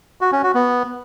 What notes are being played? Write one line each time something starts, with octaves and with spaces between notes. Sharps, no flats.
F#4
C#4
F#4
B3